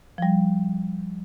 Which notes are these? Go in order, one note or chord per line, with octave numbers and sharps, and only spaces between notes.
F3 G3